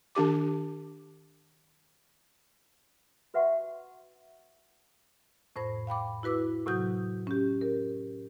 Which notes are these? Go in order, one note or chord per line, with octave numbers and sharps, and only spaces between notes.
D#3 D4 G4 D6
F#4 B4 E5 F#5 C6 C#6
F2 A2 C5 B5 A#6
F5 G5 B5 D6
E4 F#4 B4 D6 E6
A2 C3 F#3 F#4 D#6 G6
C#4 G4
A#4